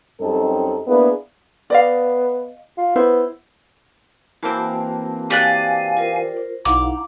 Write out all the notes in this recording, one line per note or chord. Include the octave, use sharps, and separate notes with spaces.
F#2 G3 C4 D#4 A4
A#3 B3 D4 E4 G#4 B4
B3 D5 D#5 F5
F4
B3 E4 C5
E3 A#3 C4 F#4 A5
G4 D5 F5 G#5 F#6
F4 A#4 C5
B1 D#4 E4 F5 F#5 D6